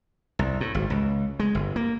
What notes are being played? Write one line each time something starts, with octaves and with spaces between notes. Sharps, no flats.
C2
A2
G#1
C#2
G#3
G1
A#3